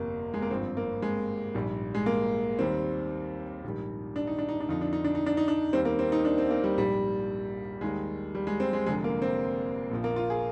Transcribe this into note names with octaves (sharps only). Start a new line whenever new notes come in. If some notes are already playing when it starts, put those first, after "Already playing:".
Already playing: G1 F2 C3 A#3
G#3
A#3
G#1 G2 F3 C4
A#3
G#3
A#1 G#2 G3
G#3
A#3
D#2 D#3 G3 C4
A#1 G#2 D#3 G3
D4
D#4
D4
D#4
D4
F2 D3 F3 D#4
D4
D#4
D4
D#4
D4
D#4
D4
D#2 D#3 G3 C4
A#3
C4
D#4
D4
C4
A#3
G3
A#1 G#2 G3
D#2 D#3 G3 G#3
G3
G#3
C4
G#3
F1 F2 D3 G#3
A#3
C4
A#1 A#2 F3
A#3
F4
G#4